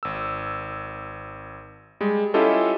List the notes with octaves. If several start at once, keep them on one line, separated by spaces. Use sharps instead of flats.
G#1 E6
G3 G#3
C#4 E4 F4 G4 A4 D#5